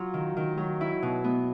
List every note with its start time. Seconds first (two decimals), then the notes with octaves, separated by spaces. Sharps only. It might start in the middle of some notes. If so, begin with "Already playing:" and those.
Already playing: F#3 F4
0.14 D#3
0.37 D#3
0.57 F#3
0.81 E4
1.02 B2
1.24 B3